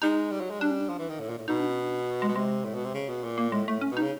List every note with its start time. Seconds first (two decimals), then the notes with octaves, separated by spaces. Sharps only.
0.02 G#3 D#4
0.32 G3
0.41 F#3
0.50 G#3
0.60 G3 D4
0.71 C#4
0.80 D4
0.89 F3
0.99 E3
1.09 D#3
1.20 A2
1.29 A#2
1.38 A2
1.48 B2 D#4
1.60 D4
1.71 C#4
1.82 D4
2.22 G#3
2.28 B2
2.36 C3 G#3
2.65 A2
2.75 B2
2.85 C3
2.94 C#3
3.09 B2
3.24 A#2
3.38 A#3
3.52 A2 G#3
3.68 A2 A3
3.81 C#4
3.91 B2
3.97 D#4
4.02 C#3